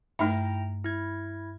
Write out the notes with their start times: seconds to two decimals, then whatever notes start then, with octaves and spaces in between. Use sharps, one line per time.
0.19 G2 A3 D#4 E4 E5 G5 A#5
0.84 E4 G#6